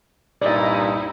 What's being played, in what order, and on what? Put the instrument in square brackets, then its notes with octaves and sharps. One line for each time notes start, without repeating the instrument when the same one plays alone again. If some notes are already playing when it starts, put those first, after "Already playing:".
[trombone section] C2 G2 A#2 [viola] D#4 E4 [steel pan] D5 D#5